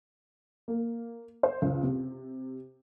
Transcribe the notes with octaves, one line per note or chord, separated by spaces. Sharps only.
A#3
C5
C#2
C3